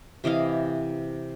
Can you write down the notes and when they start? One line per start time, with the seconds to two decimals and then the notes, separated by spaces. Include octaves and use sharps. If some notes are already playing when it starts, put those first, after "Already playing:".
0.24 C3 E3 D#5 F5